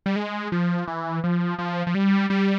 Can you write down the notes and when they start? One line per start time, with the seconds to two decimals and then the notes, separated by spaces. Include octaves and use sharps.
0.06 G3
0.16 G#3
0.52 F3
0.88 E3
1.24 F3
1.59 F3
1.87 F3
1.95 G3
2.30 G3